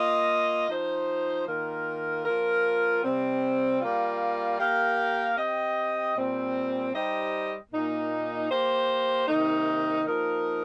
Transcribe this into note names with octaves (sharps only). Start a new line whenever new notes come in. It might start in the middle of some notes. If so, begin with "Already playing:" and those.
Already playing: A#3 F4 D#5
F3 D#4 C5
D#3 A#3 F4 A#4
F3 A#3 F4 A#4
C3 G3 C4
G3 A#3 F4
A#3 G4 A#4 F5
C4 G4 D#5
A#2 G3 C4
G3 D#4 G4 C5 D#5
A#2 A#3 D#4
A#3 G4 C5
C3 D#3 A#3 D#4
F3 A#3 D#4 A#4